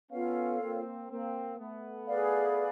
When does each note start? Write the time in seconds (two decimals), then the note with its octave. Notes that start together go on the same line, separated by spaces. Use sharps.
0.11 B3 C#4 F4 A4 C#5 F5
0.61 A#3 C4
1.10 A#3 C4
1.59 A3 B3
2.07 G#4 B4 D5 F5